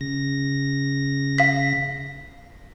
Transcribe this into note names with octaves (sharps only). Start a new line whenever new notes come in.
C#3 A#6
F5 B6